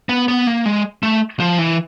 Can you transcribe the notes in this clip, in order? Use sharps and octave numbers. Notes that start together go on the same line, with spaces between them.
B3
B3
A#3
G#3
A3
F3
E3